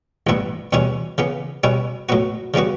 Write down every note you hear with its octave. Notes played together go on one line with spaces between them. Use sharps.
A1 G2 E3 B3 E4
E2 B2 G3 C#4 E4
C#3 E3 B3
B2 G3 C#4 E4
A2 F#3 B3 F#4
C#3 E3 G3 B3 F#4